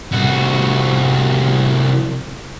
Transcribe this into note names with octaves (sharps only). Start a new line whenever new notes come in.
C2 F#4